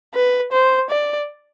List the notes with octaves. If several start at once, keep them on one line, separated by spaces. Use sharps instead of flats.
B4
C5
D5